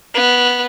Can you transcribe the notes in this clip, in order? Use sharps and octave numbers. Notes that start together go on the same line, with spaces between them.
B3